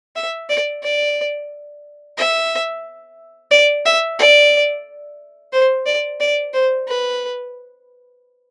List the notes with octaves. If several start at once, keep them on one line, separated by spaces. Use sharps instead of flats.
E5
D5
D5
E5
D5
E5
D5
C5
D5
D5
C5
B4